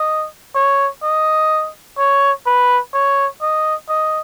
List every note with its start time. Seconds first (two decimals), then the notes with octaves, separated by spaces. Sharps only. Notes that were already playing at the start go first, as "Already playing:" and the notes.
Already playing: D#5
0.55 C#5
1.03 D#5
1.98 C#5
2.46 B4
2.94 C#5
3.41 D#5
3.89 D#5